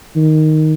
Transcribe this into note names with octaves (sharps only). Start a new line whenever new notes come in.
D#3